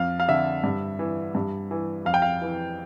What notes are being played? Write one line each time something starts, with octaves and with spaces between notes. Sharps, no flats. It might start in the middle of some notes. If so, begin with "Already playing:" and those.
Already playing: F2 F5
F5
D3 E5
G2
E3
G2
E3
F2 F5
G5
F5
E3